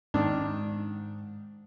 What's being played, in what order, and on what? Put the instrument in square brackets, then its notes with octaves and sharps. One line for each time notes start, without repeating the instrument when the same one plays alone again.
[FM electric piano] G#2 [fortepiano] D#3 D4